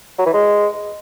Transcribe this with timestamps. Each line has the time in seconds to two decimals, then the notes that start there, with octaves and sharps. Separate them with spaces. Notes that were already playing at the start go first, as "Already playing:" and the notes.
0.18 F#3
0.26 E3
0.33 G#3